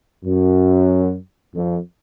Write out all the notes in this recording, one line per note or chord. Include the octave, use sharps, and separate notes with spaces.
F#2
F2